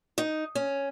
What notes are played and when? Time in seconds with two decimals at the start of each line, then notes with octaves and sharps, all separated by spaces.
0.18 D#4
0.55 C#4